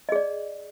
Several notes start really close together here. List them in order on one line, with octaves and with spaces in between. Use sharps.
D#5 G#4 D5